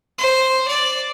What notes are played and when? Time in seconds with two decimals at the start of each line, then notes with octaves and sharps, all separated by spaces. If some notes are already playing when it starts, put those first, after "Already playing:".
0.18 C5
0.68 D5